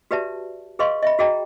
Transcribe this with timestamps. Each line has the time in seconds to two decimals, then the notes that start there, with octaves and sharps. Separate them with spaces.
0.11 F#4 G4 B4 D5 E5 A5
0.79 G#4 B4 D#5 F5 C6 C#6
1.02 D#5 E5 B5
1.19 F#4 G#4 D#5 G5 A#5